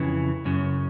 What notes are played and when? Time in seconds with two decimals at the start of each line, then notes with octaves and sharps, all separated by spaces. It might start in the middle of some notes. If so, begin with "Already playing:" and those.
Already playing: F2 C#3 E3
0.45 F#2 C#3